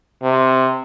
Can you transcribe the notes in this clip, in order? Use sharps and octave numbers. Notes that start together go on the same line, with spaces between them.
C3